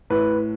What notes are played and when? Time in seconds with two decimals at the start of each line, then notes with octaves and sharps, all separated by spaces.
0.10 A2 B4